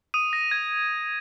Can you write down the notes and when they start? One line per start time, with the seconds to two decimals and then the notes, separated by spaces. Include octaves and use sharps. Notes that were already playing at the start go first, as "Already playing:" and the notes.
0.14 D#6 D#7
0.33 A#6
0.51 G#6